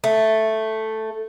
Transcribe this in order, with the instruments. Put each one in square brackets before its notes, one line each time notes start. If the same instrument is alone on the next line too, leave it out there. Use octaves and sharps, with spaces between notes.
[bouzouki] A3